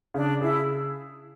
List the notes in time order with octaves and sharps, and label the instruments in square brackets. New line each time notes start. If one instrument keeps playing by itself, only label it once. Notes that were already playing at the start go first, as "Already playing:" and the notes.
[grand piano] C#3 [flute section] D4
[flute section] E4 [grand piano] G#4